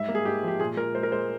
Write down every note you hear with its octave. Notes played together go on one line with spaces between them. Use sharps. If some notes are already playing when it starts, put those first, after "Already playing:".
Already playing: G#2 G3 E5
A#3
G#4
G#2 G4
F3 G4
A#2 G#4
A#2 A#4
G#3 C5
A#4
G#3 C5